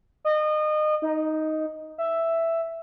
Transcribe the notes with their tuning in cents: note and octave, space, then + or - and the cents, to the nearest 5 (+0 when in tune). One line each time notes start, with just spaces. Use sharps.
D#5 -30
D#4 +5
E5 +5